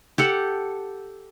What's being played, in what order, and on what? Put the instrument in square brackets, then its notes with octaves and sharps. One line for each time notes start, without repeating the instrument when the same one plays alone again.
[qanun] G4 A4 F#5